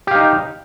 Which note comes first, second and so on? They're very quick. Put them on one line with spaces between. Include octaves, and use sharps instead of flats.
G4 F5 D#4